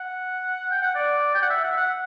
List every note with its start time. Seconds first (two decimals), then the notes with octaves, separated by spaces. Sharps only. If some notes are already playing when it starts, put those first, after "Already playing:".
Already playing: F#5
0.71 G5
0.82 F#5
0.95 D5
1.35 G5
1.43 F#5
1.50 E5
1.64 F#5
1.71 E5
1.77 F#5